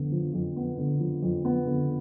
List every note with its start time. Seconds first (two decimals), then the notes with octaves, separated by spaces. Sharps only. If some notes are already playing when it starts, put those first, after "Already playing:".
Already playing: F2 D3 B3
0.12 F3
0.34 F2
0.56 B3
0.77 D3
1.00 F3
1.23 F2
1.45 B3
1.66 D3